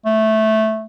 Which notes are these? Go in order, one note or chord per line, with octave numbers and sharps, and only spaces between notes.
A3